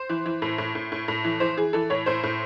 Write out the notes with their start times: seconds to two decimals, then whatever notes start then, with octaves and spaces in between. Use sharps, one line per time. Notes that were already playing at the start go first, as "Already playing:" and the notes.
Already playing: C5
0.09 E3
0.26 E3
0.42 A2
0.58 A2
0.75 A2
0.92 A2
1.08 A2
1.25 E3
1.40 E3 C5
1.57 E3 G#4
1.73 E3 A4
1.90 A2 C#5
2.06 A2 C5
2.23 A2